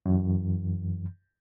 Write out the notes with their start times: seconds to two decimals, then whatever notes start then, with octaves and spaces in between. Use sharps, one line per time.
0.06 F#2 E3